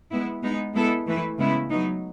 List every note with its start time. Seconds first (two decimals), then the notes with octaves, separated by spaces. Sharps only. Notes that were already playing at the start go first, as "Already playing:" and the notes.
0.11 G#3 B3 E4
0.43 G#3 B3 D#4
0.74 G#3 B3 E4 A4
1.07 E3 A3 E4 B4
1.38 C#3 G#3 B3 E4
1.71 F#3 B3 D#4